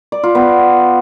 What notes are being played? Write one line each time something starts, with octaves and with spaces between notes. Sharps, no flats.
D5
F4
B3